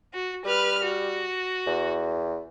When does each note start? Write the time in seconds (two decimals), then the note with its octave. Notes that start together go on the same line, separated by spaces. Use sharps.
0.13 F#4
0.45 G3 B4 F6
0.83 F#4
1.67 E2